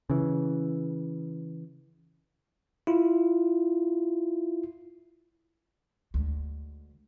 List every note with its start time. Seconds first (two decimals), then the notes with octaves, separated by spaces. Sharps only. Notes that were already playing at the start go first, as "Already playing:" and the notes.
0.10 C#3 E3
2.87 E4 F4
6.14 D2 G#3